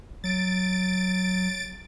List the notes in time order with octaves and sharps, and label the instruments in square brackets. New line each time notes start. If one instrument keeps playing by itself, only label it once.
[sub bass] F#3 [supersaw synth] A6 D7